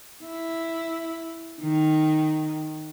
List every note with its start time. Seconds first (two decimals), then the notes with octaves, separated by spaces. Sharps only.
0.25 E4
1.61 D#3